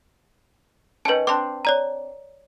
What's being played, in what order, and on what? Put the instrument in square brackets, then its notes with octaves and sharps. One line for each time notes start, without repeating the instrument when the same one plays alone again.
[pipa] D#3 C#4 [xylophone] B4 A5
[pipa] C4 D4 [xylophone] C6 D6
[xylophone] C#5 D5 A#5